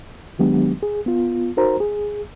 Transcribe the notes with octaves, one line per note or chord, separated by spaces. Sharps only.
D#3 F#3 G#3 B3 D4 G4
G#4
B3 F4
D#4 F#4 A#4 C5 A#5
G#4